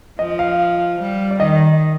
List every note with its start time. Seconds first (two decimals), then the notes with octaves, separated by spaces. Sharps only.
0.19 F3 D#5
0.39 F5
1.00 G3
1.31 D5
1.40 D#3 D#5